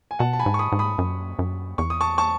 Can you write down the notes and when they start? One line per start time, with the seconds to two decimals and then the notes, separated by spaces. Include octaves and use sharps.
0.11 G#5
0.19 B2 F#5 A5
0.33 A5
0.39 G#5 B5
0.46 G#2
0.54 C#6
0.59 B5 D#6
0.72 G#2
0.79 B5 D#6
0.98 F#2
1.39 F#2
1.78 E2 C#6
1.90 D#6
2.01 A5 C#6
2.18 A5 C#6